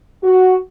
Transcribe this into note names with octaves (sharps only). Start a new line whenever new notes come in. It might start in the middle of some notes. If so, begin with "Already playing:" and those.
F#4